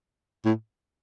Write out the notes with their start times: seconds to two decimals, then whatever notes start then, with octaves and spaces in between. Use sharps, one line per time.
0.45 A2